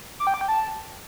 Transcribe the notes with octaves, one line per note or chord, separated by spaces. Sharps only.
D6
G5
D6
G5
A5